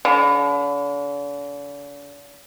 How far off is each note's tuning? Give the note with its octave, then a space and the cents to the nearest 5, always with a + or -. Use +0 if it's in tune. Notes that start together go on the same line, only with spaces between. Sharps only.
D3 -45